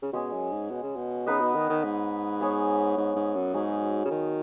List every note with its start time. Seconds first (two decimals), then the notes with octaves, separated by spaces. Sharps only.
0.02 C#3
0.13 B2 G#3 C#4 G#4
0.33 F#2
0.52 G#2
0.71 B2
0.83 C#3
0.96 B2
1.27 C#3 B3 D#4 B4 D#5
1.41 B2
1.55 D#3
1.70 D#3
1.84 G#2
2.40 B3 G#4 C#5
2.97 G#2
3.16 G#2
3.35 F#2
3.54 G#2 F#3 D#4 G#4 C#5
4.05 C#3
4.10 D#3